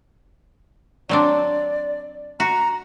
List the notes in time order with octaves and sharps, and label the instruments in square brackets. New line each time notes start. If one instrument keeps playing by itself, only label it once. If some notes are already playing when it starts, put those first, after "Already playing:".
[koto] F#3 C4 D4 [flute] D5
[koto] F#4 [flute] A#5